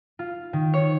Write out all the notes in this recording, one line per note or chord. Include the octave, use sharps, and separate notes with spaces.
F4
D#3
C#5